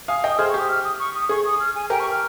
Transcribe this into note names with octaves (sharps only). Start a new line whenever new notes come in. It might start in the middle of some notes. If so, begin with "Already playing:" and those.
F5 G#5 D#6
D#5 G5
D#6
G#4 C5 F6
C#6
G4
D#6
F6
D#6
C#6
D#6
G#4 C#6
D#6
F6
G#5
G4 A#4 G5
C#6
F6